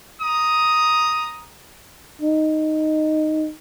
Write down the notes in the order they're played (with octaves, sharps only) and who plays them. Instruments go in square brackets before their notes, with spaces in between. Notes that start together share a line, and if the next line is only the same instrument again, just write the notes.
[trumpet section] A#5 D#6
[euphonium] D#4